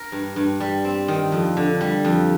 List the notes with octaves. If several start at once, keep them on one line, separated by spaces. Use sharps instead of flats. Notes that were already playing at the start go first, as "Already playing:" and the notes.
Already playing: A#4
G2
G2
G3
C4
D#3
F2
D3
G3
F2